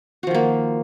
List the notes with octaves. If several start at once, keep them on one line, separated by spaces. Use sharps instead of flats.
D#3 F3 A#3 F#4